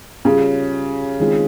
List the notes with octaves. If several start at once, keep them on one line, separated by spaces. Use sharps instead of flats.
C#3 G3 C#4 F4 G#4
D#3 G#3 C4 F4 G#4